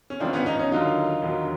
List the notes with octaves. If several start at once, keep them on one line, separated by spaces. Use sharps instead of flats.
C#4
G#1 G#2 F3 C4 D4
B3 C#4
C#4 D#4
C#4 D#4
D#2 D3 F#3 D#4 F4
E1 D#2 D3 F#3